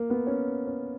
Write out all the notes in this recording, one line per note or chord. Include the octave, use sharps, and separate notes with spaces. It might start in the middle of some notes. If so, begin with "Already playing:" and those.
Already playing: A#3
B3
C#4
C#4